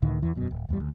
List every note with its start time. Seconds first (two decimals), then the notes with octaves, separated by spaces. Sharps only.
0.02 C#2 A2 D3 D#3
0.22 E2 E3
0.35 E1 F#2 B2
0.51 D1
0.69 D1 E2 G2 G3
0.80 D2